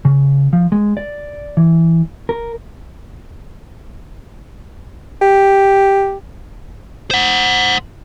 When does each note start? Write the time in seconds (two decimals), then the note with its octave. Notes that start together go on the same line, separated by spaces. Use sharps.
0.05 C#3
0.53 F3
0.72 G#3
0.97 D5
1.57 E3
2.29 A#4
5.22 G4
7.11 C5 F#5